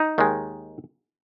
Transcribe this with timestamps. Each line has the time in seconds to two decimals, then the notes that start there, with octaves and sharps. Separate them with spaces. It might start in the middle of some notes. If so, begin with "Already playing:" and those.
Already playing: D#4
0.18 D#2 D#3 G#3